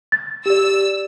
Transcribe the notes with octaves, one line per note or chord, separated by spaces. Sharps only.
A6
G4 D5 E6